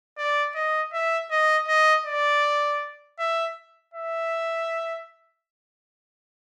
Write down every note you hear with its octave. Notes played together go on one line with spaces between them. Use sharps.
D5
D#5
E5
D#5
D#5
D5
E5
E5